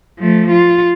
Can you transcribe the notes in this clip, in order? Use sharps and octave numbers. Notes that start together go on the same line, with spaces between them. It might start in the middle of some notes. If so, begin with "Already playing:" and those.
F3 A3
F4